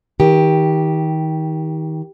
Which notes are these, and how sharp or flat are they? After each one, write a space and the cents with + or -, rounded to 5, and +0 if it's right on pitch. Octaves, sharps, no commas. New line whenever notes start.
D#3 +30 G4 +0